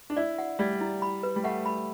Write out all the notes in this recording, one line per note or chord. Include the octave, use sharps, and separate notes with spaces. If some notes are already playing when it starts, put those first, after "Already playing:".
D4
E4 D5
F#5
G3 D5
E4
B5
B4
G3
A3 F#5
B5